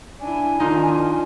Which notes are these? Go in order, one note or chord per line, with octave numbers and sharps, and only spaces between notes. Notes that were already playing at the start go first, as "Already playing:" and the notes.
D4 E4 G#5
D#3 D4 D#4 F4